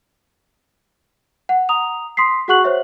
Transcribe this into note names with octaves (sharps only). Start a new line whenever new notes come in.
F#5
A#5 D#6 F7
C6 D#6 B6 C7
F#4 G#4 F#5 C#6 F#6 F#7
C5 C#5 E5